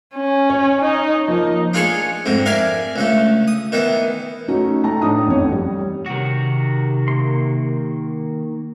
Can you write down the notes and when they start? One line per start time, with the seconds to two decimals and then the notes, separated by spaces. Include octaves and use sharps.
0.14 C#4
0.50 C#5
0.82 D#4
1.28 F3 A#3 D#4
1.74 D4 F4 G#4 A4 C#5
2.26 F2 G#2 D3
2.46 A#4 D5 E5 F5 G#5
2.96 C#2 D3 A3
3.48 D#6
3.72 D#3 E3 B3
4.48 A3 C#4 D#4 F#4
4.84 A3 A5 A#5
5.02 A2 D4 D#4 D#6
5.28 A1 F2 C#5
5.52 G3
6.06 C3 D#3 F#4
7.08 A#3 C6